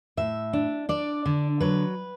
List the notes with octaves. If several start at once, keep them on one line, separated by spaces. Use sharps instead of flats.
A2 E5
D4
D4 D5
D3
F#3 B4